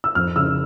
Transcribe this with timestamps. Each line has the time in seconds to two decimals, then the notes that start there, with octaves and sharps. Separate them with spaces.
0.04 E6
0.15 F2 F6
0.36 C#3 E6